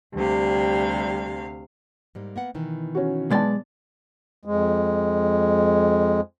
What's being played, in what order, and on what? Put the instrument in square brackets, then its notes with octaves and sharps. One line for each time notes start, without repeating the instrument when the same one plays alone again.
[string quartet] D2 C3 F5 [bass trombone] G3
[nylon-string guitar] G#2 G3 A#3
A#3 B3 F#5
B2 D#3 E3
[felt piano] C#4 F#4
[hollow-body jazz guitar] B1 G#3 D5 [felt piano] B3 A5
[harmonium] F2 G#3